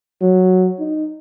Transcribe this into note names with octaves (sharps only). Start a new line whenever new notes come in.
F#3
D#4